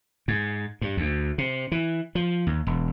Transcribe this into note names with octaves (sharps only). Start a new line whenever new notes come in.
G#2
G2
D2
C3
E3
F3
D#2
E1